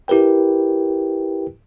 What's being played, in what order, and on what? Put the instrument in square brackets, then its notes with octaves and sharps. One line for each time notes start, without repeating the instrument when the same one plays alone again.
[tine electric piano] E4 G4 A#4 B4 G5